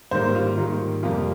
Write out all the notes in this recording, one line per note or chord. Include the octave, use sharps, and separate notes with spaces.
G#2 D#3 G3 A#3 C5
F4
G#2 D#3 G3 A#3 F4
F2 C3 G3 A#3 F4